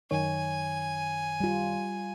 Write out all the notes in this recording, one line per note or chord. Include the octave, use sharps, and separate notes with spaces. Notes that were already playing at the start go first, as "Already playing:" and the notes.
F#2 D#3 C#5 G#5
G3 F4